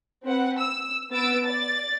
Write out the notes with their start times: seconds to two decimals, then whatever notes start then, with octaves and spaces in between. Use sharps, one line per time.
0.24 C4 B4 F#5
0.59 E6
1.11 B3 E6 A6 D7
1.44 D5 A6